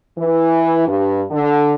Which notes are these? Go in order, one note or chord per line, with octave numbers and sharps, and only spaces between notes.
E3
G2
D3